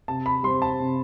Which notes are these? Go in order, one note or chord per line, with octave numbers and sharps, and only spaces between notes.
C3 A5
B5
G3 C4 C6
A5
C3